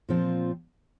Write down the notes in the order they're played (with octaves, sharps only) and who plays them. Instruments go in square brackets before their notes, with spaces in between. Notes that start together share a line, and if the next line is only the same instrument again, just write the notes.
[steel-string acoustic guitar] A#2 F3 C4 F4